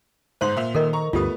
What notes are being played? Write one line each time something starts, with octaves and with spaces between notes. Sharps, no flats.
G1 G#2 C5 C6 F#7
A#2 E5 F7
D#3 A4 A#4 D#5
A#5 C#6
D2 G2 A3 B3 F4 G4 B4 D#6